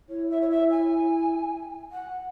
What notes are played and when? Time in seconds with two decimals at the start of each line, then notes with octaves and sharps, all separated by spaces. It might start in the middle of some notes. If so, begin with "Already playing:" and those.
0.09 E4 C#5
0.30 E5
0.41 C#5
0.50 E5
0.70 G#5
1.92 F#5